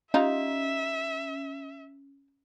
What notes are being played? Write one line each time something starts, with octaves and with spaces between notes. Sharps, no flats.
C#4 D#4 F4 E5